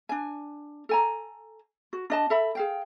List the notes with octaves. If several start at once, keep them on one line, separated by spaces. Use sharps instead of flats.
D4 G#5
A4 G#5 A#5
F#4
D4 D#5 A5
A4 E5 B5
G#4 F5 G5